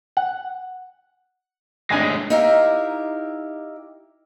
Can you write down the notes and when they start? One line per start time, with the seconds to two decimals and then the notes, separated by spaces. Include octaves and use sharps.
0.17 F#5
1.90 G#1 A2 C3 G#3 D4 G#5
2.30 D#4 E4 G4 A#4 E5 F5